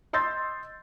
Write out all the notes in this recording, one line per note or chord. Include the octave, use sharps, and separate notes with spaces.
D#5 C6 E6 G6 A6